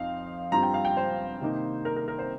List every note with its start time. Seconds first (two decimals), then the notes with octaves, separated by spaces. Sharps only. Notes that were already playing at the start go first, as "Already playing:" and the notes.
Already playing: F2 F3 C4 D#4 F5
0.52 G2 G3 C4 F4 A#5
0.63 G5
0.74 F5
0.85 G5
0.97 C5
1.41 C3 D#3 A#3 D#4
1.85 A#4
1.96 A#4
2.08 A#4
2.19 C5